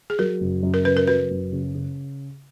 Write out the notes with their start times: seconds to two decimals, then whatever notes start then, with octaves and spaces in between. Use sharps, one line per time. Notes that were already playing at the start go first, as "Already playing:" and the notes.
0.10 G#4
0.19 F#3 A#4
0.41 F#1
0.63 F#2
0.74 A#4
0.85 C#3 B4
0.97 A#4
1.07 F#3 B4
1.30 F#1
1.52 C#3
1.75 C#3